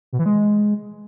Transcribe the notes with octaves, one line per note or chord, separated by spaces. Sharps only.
B2
E3
G#3